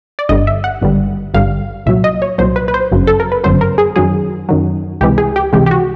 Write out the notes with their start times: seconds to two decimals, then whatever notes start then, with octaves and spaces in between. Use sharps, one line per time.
0.19 D5
0.29 G1 G2 D3 D#5
0.47 E5
0.64 F#5
0.82 G#1 G2 D3 G3
1.34 G#1 G2 D3 G3 F5
1.86 C2 A#2 F#3 E5
2.04 D#5
2.22 C#5
2.38 C2 A#2 F#3 C5
2.56 B4
2.68 B4
2.74 C5
2.92 G1 F#2 C#3 F#3
3.07 A4
3.20 A#4
3.32 B4
3.44 G1 F#2 C#3 F#3 C5
3.61 A#4
3.78 G#4
3.96 F#2 D#3 F#3 G#4
4.49 F#2 D#3 F#3
5.01 C#2 C3 E3 G#3 G4
5.18 G#4
5.36 G4
5.53 C#2 C3 E3 G#3 G4
5.66 G4
5.71 F#4